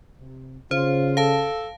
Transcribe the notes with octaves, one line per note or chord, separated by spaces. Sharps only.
C3
C#3 F4 C5
A4 F5 A5